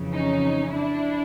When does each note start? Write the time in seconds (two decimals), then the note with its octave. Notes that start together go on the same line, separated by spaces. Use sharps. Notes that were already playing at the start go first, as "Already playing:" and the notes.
Already playing: F2 C#3 E3
0.14 C#4 D#4
0.73 D4 E4